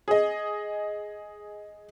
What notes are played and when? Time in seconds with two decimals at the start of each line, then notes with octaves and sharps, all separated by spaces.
0.08 G#4 D#5